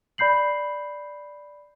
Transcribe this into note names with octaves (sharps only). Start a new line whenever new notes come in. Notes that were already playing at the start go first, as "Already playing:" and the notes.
D5 B5 G6 C7 F#7